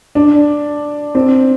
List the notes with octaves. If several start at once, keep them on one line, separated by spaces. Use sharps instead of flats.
D4
C4